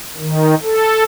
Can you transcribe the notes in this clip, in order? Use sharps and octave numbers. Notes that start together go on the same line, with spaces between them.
D#3
A4